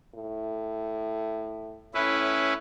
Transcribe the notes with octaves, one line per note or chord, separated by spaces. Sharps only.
A2
A2 C#4 E4 B4